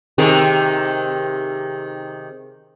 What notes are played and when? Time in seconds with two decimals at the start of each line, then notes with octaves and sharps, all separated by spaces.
0.18 C3 D#3 G#4